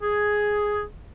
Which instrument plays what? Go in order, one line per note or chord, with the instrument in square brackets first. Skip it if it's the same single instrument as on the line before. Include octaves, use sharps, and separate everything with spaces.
[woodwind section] G#4